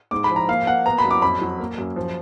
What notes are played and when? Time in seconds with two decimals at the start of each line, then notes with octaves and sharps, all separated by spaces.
0.11 G#2 D6
0.24 B5
0.30 F3
0.36 A#5
0.48 A#3 F5
0.67 A#3 F#5
0.86 B3 A#5
0.98 B5
1.04 F#2
1.11 D6
1.22 F2 B5
1.41 F#3
1.59 A#3
1.78 F#2
1.96 F3